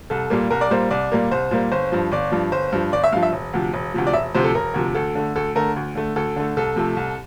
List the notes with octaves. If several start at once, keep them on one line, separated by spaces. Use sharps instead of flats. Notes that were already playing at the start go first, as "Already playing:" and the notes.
C2 A4
A#2 G3 A#3
C2 A#4
D5
A#2 G3 A#3 C5
C2 D5
A#2 G3 A#3
C2 C5
A#2 G3 A#3
G1 C5
G2 F3
G1 D5
G2 F3
G1 C5
G2 F3
G1 D5
E5
G2 F3 F5
E5
E1
D2 C3 F3
E1
D2 C3 F3
D5
E1 E5
D2 C3 F3 C5
A4
E1 A#4
D2 C3 F3
D2 A4
D3 A3
D2 A4
D3 A3 A#4
D2
D3 A3
D2 A4
D3 A3
C2 A4
C3 F3 A3
C2